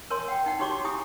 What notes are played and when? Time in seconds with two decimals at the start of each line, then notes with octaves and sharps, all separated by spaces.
0.10 A#4 C#5 G#5 C6
0.28 F#5 G5
0.46 D#4 F#5
0.59 D#4 F#4 G4 C#5 C6 D6
0.84 E4 G4 G#5 D#6